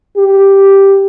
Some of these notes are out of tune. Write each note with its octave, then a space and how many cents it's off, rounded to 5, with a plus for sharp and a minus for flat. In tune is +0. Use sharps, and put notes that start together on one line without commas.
G4 +0